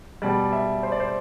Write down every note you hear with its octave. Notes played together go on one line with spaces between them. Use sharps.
B2 G3 D5
E5
C5
D5
C5